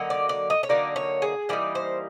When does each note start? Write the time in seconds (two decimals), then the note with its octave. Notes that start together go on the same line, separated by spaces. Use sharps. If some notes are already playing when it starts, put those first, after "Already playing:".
Already playing: D3 F#3 A#3 D#4
0.10 D5
0.29 D5
0.50 D#5
0.63 C#5
0.69 D3 F#3 A#3 D#4 D5
0.96 C#5
1.22 G#4
1.49 E3 G3 A#3 D#4 D5
1.75 C5